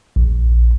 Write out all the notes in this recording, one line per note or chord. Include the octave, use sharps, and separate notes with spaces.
A#1